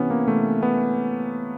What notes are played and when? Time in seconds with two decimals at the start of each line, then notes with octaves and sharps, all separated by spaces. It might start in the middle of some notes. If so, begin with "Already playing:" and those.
Already playing: C3 E3 B3 C#4
0.10 A#3
0.28 C3 E3 A3
0.63 B3